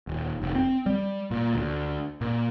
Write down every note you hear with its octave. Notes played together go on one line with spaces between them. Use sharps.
D#1
F1
C4
G3
A#2
D2
A#2